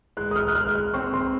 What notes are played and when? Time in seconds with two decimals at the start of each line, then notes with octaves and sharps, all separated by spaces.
0.17 G#3 F#6
0.31 D#6
0.36 F6
0.48 F#6
0.55 G#3 F6
0.75 F6
0.94 C4 C#6
1.14 C6